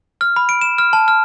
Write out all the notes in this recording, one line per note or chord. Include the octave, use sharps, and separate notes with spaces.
F6
B5
D7
E7
F6
A5
F6